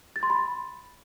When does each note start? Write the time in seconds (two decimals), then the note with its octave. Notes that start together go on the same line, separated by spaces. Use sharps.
0.16 A6
0.23 C6
0.30 B5